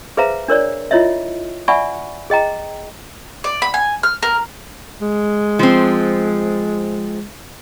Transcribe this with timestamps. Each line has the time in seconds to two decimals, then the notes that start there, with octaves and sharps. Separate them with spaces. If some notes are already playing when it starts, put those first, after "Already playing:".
0.17 G#4 B4 C5 E5 F5 A#5
0.48 D4 A#4 C#5 D5
0.91 E4 F4 C#5 D#5 E5
1.68 D5 E5 F#5 G#5 B5 C#6
2.30 G#4 D#5 G5 A#5
3.44 D5
3.62 B5
3.74 G#5
4.03 F6
4.23 A#4
5.01 G#3
5.59 F3 C4